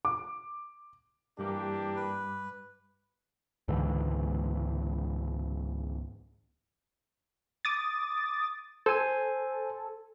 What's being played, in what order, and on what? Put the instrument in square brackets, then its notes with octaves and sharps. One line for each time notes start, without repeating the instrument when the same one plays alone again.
[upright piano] D6
[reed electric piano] G2 G3 D6 [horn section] E3 A#3 G4 [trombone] D4
[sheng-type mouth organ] B4
[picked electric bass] C#2 G#2 D3 E3
[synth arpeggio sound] D6 D#6 A6
[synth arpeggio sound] A4 [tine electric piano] C5 G#5